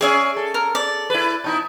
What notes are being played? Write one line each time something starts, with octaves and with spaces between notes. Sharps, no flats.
C#4 G#4 D5 E5 G#5
A4
A#4
D5
E4 B4
B2 D#4 E4